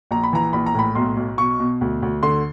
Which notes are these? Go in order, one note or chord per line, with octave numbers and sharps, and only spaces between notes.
A#1 A#5
B5
E3 A#5
A#1 B5
A#5
A2 B5
B1 C6
B1
B2 C#6
B2
D2
D2
D3 C6